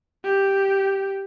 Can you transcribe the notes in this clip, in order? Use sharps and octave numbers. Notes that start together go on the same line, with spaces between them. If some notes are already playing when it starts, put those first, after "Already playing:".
G4